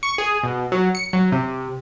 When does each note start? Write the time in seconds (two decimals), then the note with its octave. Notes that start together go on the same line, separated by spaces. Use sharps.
0.03 C#6
0.18 G#4
0.43 B2
0.72 F#3
0.95 C#7
1.13 F#3
1.32 C3